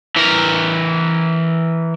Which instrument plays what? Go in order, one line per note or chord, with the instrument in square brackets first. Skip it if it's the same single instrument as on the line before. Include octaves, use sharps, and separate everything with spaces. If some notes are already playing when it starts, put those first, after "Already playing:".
[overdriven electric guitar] E3 A#4